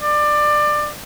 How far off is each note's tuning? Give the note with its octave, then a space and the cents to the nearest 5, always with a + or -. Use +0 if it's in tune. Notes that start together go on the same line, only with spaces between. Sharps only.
D5 +20